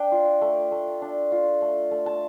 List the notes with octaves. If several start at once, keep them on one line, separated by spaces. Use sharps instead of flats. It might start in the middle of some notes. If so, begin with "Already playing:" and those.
Already playing: D4 G5
F4
A3
A3
D4
F4
A3
A3
A5